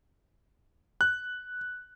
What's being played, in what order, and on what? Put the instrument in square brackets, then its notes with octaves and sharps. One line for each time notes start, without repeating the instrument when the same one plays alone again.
[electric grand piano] F#6